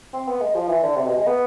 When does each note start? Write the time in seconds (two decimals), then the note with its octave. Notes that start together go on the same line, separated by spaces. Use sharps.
0.13 C4
0.28 B3
0.41 G#3
0.55 F3
0.69 E3
0.83 D3
0.96 C3
1.06 B2
1.17 G#3
1.27 B3